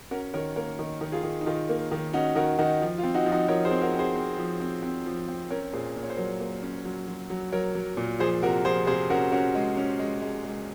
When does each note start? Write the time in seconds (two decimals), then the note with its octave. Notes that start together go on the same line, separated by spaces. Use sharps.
0.11 C#4 F#4 A#4
0.34 D#3 A#4 C#5
0.56 A#3 A#4 C#5
0.79 D#3
1.01 D#3
1.12 F4 G#4
1.23 D#3
1.41 D#4
1.46 D#3 F4
1.69 A#3
1.92 D#3
2.13 C#4 D#4 F#4
2.36 D#3 F#4 A#4
2.58 D#3 D#4 F#4
2.81 F3
2.98 F4
3.03 C4
3.14 D#4 F#4
3.26 F3
3.32 D#4 F#4
3.48 F3 A#4 C#5
3.65 G#4 C5
3.71 C4
3.82 F#4 A#4
3.94 C4
3.99 G#4 C5
4.16 C4
4.38 F3
4.60 C4
4.83 C4
5.06 F3
5.28 C4
5.50 C#4 A#4 C#5
5.73 A#2 G#4 C5
5.96 A#2
6.03 C#5
6.10 C5
6.17 F#3 A#4 C#5
6.40 A#3
6.63 C#4
6.85 F#3
7.08 F#3
7.30 F#3
7.52 F#3 A#4 C#5
7.75 F#3
7.97 A#2
8.19 F3 G#4 C5
8.42 C3 F#4 A#4
8.65 F3 G#4 C5
8.87 C3 G#4 C5
9.10 C#4 F#4 A#4
9.32 C#4 F#4 A#4
9.55 G#3
9.77 C#4
10.00 G#3
10.22 G#3
10.45 G#3